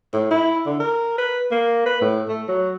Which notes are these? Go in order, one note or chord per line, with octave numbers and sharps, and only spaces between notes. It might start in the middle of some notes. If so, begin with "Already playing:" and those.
A2
E4
D3
A#4
B4
A#3
B4
A2
A3
F#3